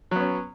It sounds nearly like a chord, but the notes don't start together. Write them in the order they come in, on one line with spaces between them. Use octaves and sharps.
F#3 B3 C#4